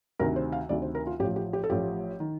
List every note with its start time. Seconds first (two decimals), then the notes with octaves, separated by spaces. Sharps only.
0.19 D2 C3 D#3 A#4
0.36 C5
0.52 F5
0.69 D2 C3 D#3 D5
0.82 C5
0.95 A#4
1.07 F4
1.20 A1 A2 F3 G4
1.36 G4
1.53 G4
1.64 A4
1.70 A1 A2 F3 G4
2.20 D#3